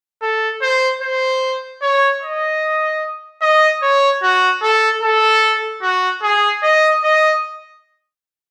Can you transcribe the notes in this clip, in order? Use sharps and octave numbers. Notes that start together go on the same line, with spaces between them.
A4
C5
C5
C#5
D#5
D#5
C#5
F#4
A4
A4
F#4
G#4
D#5
D#5